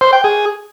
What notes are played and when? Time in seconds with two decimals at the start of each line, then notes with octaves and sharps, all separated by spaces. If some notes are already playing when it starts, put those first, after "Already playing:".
0.01 C5
0.13 G5
0.24 G#4